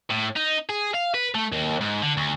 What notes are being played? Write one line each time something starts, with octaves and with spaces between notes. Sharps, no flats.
A2
D#4
G#4
F5
B4
A3
D#2
G#2
D3
D2